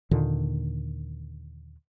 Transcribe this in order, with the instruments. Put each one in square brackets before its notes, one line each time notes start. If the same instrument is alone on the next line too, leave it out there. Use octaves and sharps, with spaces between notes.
[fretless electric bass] D#2 A#2 D3 D#3